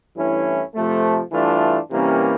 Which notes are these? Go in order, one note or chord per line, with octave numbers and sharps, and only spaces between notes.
G2 E3 A3 C#4 E4
C3 F3 A3
G2 E3 A3 D4 F4
C3 E3 G3 A#3 C#4